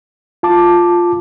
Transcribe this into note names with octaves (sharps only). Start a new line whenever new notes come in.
F4 A5 D6